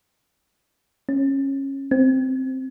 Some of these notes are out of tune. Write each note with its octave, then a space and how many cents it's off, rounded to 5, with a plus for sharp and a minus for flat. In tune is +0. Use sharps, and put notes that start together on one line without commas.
C#4 -20
C4 +0